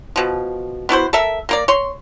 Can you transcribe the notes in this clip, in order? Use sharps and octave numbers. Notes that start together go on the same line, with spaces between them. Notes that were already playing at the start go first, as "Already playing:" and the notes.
B2 F3
B3 E4 F#4 C5
A4 A#4 E5
A#3 A#4 D5
C#5 C6